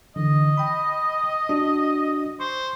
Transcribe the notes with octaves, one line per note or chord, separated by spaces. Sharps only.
D3 E3 D#5
G5 B5
D4 F#4
C5 C#6